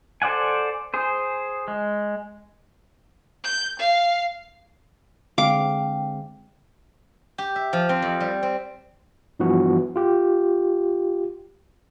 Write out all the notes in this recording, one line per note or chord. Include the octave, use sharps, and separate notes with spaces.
A4 C5 D5 F#5 G#5
G#4 C5
G#3
G6
F5
D3 G#3 C4 F5 G5 D6
G4
E5
F3
C4
F2
G3
C4
G2 E3 F3 B3 F#4
F4 G4